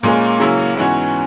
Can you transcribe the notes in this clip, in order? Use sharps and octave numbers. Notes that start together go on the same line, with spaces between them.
A#2 G#3 A#3 C#4 G#4
C#3 F#3 C#4 E4
G#2 E3 B3 C#4 F#4 C#5